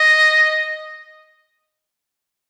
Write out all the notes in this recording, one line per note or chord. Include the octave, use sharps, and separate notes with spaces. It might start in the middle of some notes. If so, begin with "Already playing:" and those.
Already playing: D#5